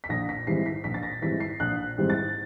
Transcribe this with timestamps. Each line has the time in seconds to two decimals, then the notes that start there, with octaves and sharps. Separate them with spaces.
0.04 B6
0.09 A#1 A#6
0.29 B6
0.47 G#2 E3 G3 C4 C7
0.66 B6
0.84 A#1 B6
0.94 A6
1.03 A#6
1.22 G#2 E3 G3 C4 B6
1.40 C7
1.60 A#1 F#6
1.98 G#2 E3 G3 C4
2.10 A6